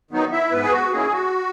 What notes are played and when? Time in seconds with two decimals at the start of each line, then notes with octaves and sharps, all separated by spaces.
0.11 D#3 F#3 B3 D#4
0.32 E4 E5
0.51 G#2 B3 B4
0.63 G#4
0.71 F#4
0.92 D#3 A#3 C#4 E4 G#4
1.13 F#4